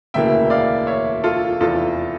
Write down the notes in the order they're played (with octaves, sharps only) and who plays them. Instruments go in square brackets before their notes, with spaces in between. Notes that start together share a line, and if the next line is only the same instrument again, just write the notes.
[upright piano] E1 D2 C#3 E3 A#3 E5 G5
D5 F5
C#5 E5
F4 A4
F1 E2 E3 F4 A4